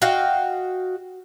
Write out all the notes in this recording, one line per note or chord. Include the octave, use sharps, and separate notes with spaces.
F#4 D#5 F5 G5